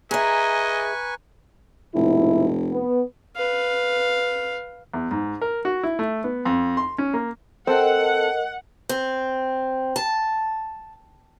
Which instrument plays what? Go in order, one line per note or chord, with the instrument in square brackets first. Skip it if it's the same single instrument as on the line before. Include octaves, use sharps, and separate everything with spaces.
[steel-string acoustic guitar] G#4 E5 [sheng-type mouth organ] B4 G#5 C#6 [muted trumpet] D#5 [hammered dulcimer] A#5
[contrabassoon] F1 [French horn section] G#2 B2 E4
[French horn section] B3
[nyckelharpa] B4 F5
[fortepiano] E2
G#2
A#4
F#4
E4
A3
B3
F2
C6
C#4
A#3
[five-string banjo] C4 [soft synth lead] A4 [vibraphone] A#4 D#5 [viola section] F#5
[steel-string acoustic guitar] C4
A5